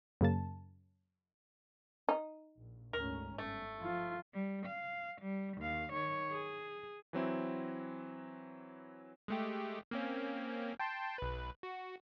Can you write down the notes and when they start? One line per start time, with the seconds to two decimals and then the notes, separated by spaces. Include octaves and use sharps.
0.21 F#2 C#3 A#3 A5
2.09 D#4
2.58 A#1
2.93 D2 G#2 C#4 A#4
3.38 G1 A3
3.82 F3 F4
4.34 G3
4.66 F5
5.22 G3
5.58 D#2 F5
5.93 D#3 C#5
6.31 G#4
7.13 E3 F#3 C4 E4
9.28 G#3 A3 G4
9.91 A#3 C4 C#4
10.79 G5 A5 C6
11.18 B1 B4
11.63 F#4